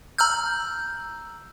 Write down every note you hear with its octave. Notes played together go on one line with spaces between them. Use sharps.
A#5 E6 F6 G6